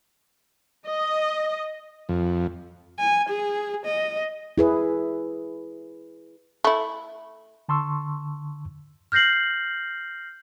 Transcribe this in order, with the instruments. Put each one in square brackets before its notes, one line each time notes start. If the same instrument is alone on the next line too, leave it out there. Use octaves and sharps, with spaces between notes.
[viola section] D#5
[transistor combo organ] F2
[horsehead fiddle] G#5
G#4
D#5
[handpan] E4 G#4 B4
[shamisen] A3 E4
[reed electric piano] D3 A5 C6 C#6 E6
[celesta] F6 G6 A#6 C7 F#7